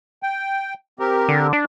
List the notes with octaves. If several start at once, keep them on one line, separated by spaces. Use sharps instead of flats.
G5
C4 G4 A#4
D3
D4